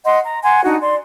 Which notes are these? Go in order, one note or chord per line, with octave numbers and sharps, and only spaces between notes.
D#5 F#5 C6
A#5
F#5 G#5 C6
D4 D#4 F#4 F#5
D5 C6